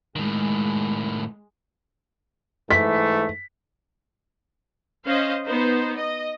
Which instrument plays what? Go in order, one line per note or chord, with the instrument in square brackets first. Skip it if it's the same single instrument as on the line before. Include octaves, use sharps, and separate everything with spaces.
[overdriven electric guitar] A2 D#3 [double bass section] G#3
[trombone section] G#2 E3 A3 [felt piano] B6
[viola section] C#4 C5 D#5 F5
B3 D#4 C5
D#5